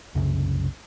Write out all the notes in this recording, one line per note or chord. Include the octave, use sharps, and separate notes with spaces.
C2 F#2 C#3